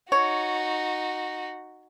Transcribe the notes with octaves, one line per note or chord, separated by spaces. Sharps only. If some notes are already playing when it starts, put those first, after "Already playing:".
D#4 F#4 C#5